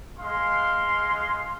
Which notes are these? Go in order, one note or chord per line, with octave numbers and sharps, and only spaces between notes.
G#3 F5 C6